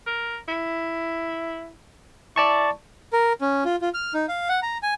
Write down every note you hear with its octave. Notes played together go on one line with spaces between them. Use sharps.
A#4
E4
E4 D5 A5 C#6
A#4
C#4
F4
F4
F6
D#4
F5
F#5
A#5
G#5